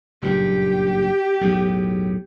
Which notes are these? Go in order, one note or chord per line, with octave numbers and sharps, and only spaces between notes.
F#1 G2 A#2 G4
B1 E2 A2